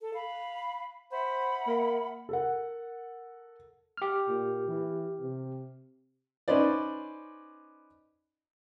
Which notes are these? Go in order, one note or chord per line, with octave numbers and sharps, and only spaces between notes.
A4
F5 B5
C5 E5 F#5 B5
A#3
A4 A#4 F#5
G4 F6
A#2
E3
C3
C#4 D#4 B4 C5 D5